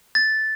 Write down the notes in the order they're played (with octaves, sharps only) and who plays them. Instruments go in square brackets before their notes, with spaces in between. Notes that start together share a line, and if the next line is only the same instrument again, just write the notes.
[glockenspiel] A6